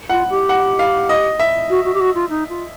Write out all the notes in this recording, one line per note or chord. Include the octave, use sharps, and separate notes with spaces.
F4 F#5
G4
F#5
F5
D#5
E5
F#4
F#4
G4
F#4
F4
D#4
F4